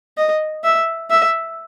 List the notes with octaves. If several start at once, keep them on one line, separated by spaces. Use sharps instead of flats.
D#5
E5
E5